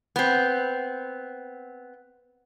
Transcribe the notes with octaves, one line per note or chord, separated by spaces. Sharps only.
B3 C4